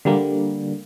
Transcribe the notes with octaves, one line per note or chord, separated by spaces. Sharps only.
D3 G3 A#3